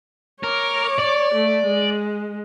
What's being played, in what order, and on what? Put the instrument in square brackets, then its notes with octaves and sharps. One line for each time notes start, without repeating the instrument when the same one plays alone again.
[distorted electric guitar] A#4 [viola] C#5 D6
[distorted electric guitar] D5
[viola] A3
G#3